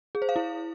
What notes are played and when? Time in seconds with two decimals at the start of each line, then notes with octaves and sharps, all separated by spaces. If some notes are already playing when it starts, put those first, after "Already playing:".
0.15 G#4
0.22 C5
0.29 F5
0.36 E4